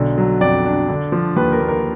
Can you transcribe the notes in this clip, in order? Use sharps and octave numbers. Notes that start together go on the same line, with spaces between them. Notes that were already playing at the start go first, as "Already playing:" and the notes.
Already playing: B1 D3
F#3
F2 D5
D4
D3
F3
D#2 B4
A#4
A#3
A#4